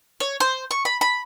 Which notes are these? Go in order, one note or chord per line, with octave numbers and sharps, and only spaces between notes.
C#5
C5
C#6
B5
B5